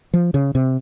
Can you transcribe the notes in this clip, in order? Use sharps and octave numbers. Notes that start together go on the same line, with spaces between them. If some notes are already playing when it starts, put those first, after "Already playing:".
F3
C#3
C3